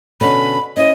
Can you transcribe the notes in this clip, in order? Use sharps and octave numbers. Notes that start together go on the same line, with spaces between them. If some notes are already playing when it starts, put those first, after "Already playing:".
B2 D3 C#4 B5
C#4 E4 C5 D#5